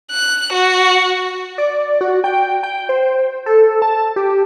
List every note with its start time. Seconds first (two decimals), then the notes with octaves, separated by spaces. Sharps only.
0.11 F#6
0.53 F#4
1.58 D5
2.01 F#4
2.24 G5
2.63 G5
2.89 C5
3.46 A4
3.82 A5
4.16 G4